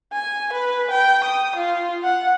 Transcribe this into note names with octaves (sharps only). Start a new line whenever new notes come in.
G#5
B4
G5
D#6
F4
F#5